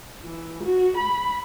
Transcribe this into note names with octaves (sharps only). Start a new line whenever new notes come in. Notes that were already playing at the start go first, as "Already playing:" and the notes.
E3
F#4
B5